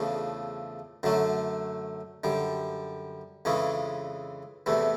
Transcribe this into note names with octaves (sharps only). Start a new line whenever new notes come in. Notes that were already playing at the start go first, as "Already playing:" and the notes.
Already playing: E2 C#3 F3 A3 D4
F#2 D3 F#3 A3
F#2 D3 G3
F2 C#3 E3 G#3 C#4
E2 C3 E3 A3